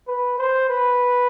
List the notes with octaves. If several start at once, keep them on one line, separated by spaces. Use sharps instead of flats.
B4
C5
B4